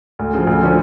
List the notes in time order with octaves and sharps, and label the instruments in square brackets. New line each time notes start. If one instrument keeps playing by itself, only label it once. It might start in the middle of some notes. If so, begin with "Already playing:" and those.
[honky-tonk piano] D2
C#3 F3
D2
D3 F3 A3 C#4